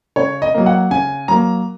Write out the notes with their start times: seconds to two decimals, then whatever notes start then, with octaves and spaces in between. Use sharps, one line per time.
0.16 C#3 C#5
0.42 D#5
0.54 F#3 A#3
0.66 F#5
0.91 C#3 G#5
1.28 F#3 A#3 A#5